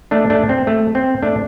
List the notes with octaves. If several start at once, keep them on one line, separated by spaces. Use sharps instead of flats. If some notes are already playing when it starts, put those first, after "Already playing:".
A3 D4
A3 D4
C4
A3
C4
A3 D4